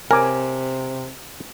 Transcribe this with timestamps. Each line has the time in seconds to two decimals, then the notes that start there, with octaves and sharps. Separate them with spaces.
0.11 C3 A#4 G#5 D6